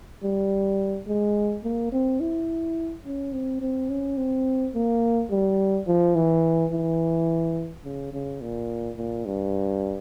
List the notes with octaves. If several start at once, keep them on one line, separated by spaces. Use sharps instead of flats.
G3
G#3
A#3
C4
E4
C#4
C4
C4
C#4
C4
A#3
G3
F3
E3
E3
C#3
C#3
A#2
A#2
G2